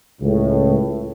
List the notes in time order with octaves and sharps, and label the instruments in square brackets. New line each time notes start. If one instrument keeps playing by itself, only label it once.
[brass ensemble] C#2 A2